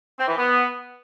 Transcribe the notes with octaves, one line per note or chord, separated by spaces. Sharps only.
C4
E3
B3